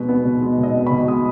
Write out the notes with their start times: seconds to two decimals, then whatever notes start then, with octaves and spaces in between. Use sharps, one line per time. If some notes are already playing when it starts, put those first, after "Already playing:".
Already playing: B2 G#3 B4
0.09 B3
0.25 B2
0.42 G#3
0.58 B2
0.63 D#5
0.75 B3
0.87 B2 B5
1.08 G#3 D#6